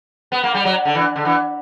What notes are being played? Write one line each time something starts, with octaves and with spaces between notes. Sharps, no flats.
B3
A#3
G3
F#3
D3
E3
D3
E3